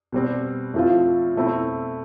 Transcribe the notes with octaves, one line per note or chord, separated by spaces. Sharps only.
B2 G3 C4
A2 F3 C4 F4
B2 A3 C4 E4